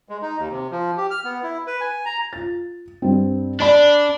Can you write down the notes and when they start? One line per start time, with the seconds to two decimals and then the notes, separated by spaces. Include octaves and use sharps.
0.09 G#3
0.22 D#4
0.39 D#2
0.51 C3
0.71 F3
0.97 G4
1.10 F6
1.24 B3
1.43 E4
1.67 B4
1.81 G#5
2.05 A#5
2.33 F4 A6
3.02 G2 C4
3.60 D4 D5 B5